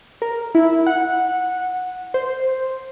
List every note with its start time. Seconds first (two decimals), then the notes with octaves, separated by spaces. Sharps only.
0.22 A#4
0.55 E4
0.86 F#5
2.14 C5